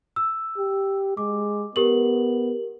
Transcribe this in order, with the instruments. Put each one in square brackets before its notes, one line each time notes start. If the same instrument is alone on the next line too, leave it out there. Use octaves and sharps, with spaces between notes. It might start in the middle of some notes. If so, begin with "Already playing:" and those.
[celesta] E6
[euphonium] G4
[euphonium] G#3 [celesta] D6
[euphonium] B3 [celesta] G4 A#4 F#7